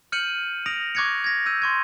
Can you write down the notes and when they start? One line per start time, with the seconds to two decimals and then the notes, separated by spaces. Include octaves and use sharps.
0.12 F6 G6 C#7 D#7 F#7
0.66 D#6 A#6 D7 F7
0.95 C#6 D6 F#6 G#6 A#6 C#7
1.24 G#6 A#6
1.46 E6 G6 D#7
1.62 C6 C#6 G#6